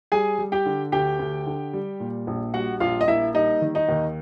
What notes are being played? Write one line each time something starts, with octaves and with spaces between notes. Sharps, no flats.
G3 G#4 G#5
G3
G4 G5
D3
D2 G4 G5
D2
D3
G3
A#2
A#1
G3 F#4 F#5
A#1 F4 F5
D#5
A#3 E4 E5
G3 D#4 D#5
D#3
D#4 D#5
D#2